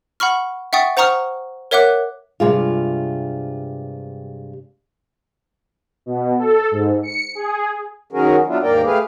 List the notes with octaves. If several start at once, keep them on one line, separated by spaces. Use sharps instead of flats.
F#5 B5 C#6 F6
E5 F#5 G5 C#6 D#6 A6
C5 F#5 A#5 C#6 D#6 F6
A#4 C#5 E5 F#5 D6 F#6
G2 C3 G#3 F4
B2
A4
G#2
C#7
G#4
D#3 F#3 C#4 F#4 G#4 A#4
F#3 B3 D4 E4 F4
D#2 G#2 A#3 A#4 D5 G5
A3 G4 G#4 B4 F5